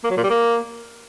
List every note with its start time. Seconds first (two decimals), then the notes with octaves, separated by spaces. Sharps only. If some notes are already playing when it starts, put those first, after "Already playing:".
0.04 A#3
0.10 F#3
0.17 A#2
0.23 G3
0.30 A#3